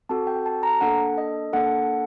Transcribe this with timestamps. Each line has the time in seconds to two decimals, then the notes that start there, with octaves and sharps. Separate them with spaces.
0.09 C4 F#4 A4 A5
0.27 G5
0.46 A5
0.63 A#5
0.81 A#3 D4 A4 F#5
1.18 D#5
1.53 A#3 D4 A4 F#5